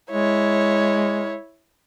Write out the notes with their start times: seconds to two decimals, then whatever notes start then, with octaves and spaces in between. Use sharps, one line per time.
0.11 G#3 E4 C#5